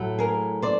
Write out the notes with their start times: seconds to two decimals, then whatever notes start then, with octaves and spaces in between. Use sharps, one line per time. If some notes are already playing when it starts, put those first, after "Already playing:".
Already playing: A2 F#3 A3
0.19 G#4 A#4
0.62 C5 D5